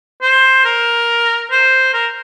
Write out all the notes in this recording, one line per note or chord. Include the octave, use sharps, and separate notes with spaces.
C5
A#4
C5
A#4